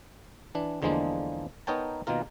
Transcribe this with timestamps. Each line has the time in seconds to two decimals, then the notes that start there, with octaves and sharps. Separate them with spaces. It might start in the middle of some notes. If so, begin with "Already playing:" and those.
0.55 E3 D4
0.82 E2 D3 F3 G#3 A#3 D4
1.67 B3 D#4 A#4 C#5 G5 A5
2.07 B2 D#3 A#3 F4 A#4